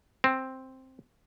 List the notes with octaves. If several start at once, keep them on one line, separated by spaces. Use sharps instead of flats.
C4